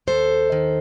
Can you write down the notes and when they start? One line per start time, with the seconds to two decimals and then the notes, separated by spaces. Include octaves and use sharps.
0.07 D#2 A4 C5
0.52 D#3